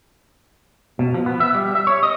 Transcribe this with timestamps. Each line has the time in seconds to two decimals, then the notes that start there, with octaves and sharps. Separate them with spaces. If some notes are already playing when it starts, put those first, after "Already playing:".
0.99 B2
1.14 F3
1.26 B3
1.40 E5
1.55 G3
1.75 E5
1.87 C#5
2.03 D#5